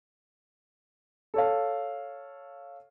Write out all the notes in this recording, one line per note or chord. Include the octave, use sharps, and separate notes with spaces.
A4 C#5 F5